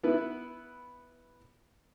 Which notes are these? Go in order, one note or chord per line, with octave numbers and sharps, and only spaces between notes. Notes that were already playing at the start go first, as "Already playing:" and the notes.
B3 E4 B4